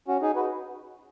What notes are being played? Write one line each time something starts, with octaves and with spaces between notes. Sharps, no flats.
C#4 F#4
D#4 G#4
F#4 B4